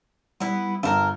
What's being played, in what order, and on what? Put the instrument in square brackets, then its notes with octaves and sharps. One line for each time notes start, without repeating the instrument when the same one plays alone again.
[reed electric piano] G3 [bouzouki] B3 E4
[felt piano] G1 [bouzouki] A4 A#4